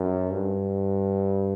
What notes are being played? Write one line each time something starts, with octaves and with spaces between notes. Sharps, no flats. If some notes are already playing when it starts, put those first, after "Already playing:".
Already playing: F#2
G2